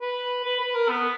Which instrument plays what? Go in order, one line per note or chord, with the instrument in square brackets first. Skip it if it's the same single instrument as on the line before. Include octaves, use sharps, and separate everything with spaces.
[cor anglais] B4
B4
B4
A#4
B3